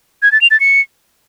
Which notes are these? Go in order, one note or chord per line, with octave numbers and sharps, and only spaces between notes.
G#6
A6
F7
A6
C#7